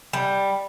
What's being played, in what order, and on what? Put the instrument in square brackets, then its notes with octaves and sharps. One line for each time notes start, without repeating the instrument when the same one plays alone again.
[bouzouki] G3